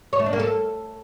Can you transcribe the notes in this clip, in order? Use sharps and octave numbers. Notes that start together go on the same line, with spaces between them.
C#5
A3
D4
A#3
A4